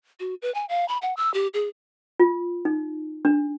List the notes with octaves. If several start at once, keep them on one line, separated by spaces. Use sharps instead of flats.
F#4
B4
G#5
F5
B5
F#5
E6
G4
G#4
F4
D#4
D4